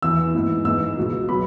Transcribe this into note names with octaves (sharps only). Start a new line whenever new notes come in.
E2 E3 B3 E6
G#2 E3 B3
G#2 E3 G#3 B3 E6
C#2 B2 B3
F#3 B3 B5